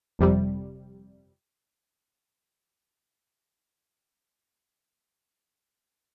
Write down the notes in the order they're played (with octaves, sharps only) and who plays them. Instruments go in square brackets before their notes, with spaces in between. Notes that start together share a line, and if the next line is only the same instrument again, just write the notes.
[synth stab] G1 F2 C3 G3